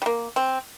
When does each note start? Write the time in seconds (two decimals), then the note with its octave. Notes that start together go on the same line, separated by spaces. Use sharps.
0.02 G3
0.06 A#3
0.36 C4